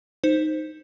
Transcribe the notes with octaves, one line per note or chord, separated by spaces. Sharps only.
D#4 C5